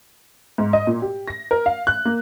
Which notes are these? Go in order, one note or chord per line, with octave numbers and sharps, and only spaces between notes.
G#2
D#5
A#2
G4
A#6
A#4
F5
F#6
A#3